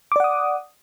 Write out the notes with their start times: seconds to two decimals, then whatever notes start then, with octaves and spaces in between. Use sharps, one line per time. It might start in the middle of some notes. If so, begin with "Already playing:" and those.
0.12 D6
0.16 D5
0.20 F#5
0.24 D#6